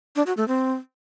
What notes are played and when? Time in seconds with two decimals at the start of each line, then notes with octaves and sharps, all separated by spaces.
0.16 D4
0.27 F#4
0.37 A3
0.48 C4